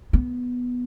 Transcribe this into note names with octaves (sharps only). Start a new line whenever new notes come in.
B3